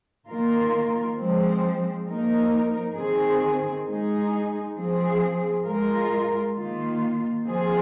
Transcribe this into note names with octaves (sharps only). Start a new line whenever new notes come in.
D#3 A#3 F4 A#4
F3 G#3 C4
F3 A#3 D#4 A#4
D#3 C4 G#4
G#3 D#4 G#4
F3 C4 G#4
G#3 F4 A#4
D#3 A#3 F4
F3 C4 F4 G#4